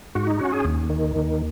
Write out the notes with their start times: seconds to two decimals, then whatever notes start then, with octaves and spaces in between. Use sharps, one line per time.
0.15 G#2 F#4
0.27 D#4
0.39 C#4 F#4
0.52 G#4
0.65 D#2
0.90 D#3
1.16 D#2